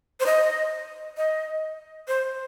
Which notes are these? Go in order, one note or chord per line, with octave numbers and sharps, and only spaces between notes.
C5
D#5
D#5
C5